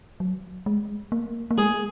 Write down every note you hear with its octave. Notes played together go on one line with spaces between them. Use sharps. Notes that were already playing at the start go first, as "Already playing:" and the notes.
F#3
G#3
A#3
A#3
G#3 G#4